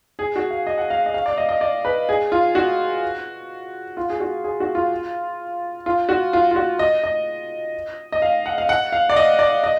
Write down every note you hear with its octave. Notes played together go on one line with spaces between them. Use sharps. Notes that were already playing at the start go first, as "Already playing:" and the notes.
G#4
F#4
F5
D#5
F#5
F5
D#5
F5
D5
D#5
D#5
D5
B4
G#4
F4
F#4
F4
G#4
F#4
G#4
F#4
F4
F4
F#4
F4
F4
F#4
D#5
D#5
D#5
F5
F#5
F5
F#5
F5
D5
D#5
D5
D#5